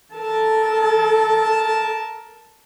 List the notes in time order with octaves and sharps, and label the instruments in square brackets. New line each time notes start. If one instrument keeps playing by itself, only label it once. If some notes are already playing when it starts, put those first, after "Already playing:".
[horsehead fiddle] A4 [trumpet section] A#4 A5